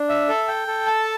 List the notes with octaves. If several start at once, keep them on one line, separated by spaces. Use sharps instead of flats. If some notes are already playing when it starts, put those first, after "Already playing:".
Already playing: D4
E5
A4
G5
A4
A5